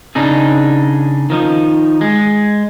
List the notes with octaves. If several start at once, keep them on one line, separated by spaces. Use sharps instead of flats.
C#3 D4 D#4 G#4
D#3 F3 D#4
G#3